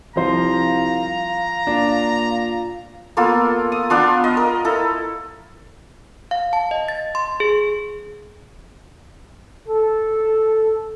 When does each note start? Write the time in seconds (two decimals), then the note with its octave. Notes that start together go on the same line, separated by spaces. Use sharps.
0.16 C2 F3 C5 F5 A#5
1.67 A#2 D4
3.17 A#3 B3 F4 A4
3.72 D#6
3.90 B3 D4 F4
4.24 D#5
4.37 A#4
4.65 E4 A4
6.31 F5
6.53 A5
6.71 D#5
6.88 A6
7.15 C6
7.40 G#4
9.68 A4